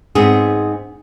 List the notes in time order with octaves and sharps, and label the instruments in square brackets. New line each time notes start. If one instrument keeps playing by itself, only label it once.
[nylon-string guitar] G#2 B3 C4 G#4